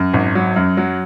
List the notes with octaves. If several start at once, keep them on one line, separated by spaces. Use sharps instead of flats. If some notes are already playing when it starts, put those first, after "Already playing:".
Already playing: F#2
G#1
F#3
F#2
F#3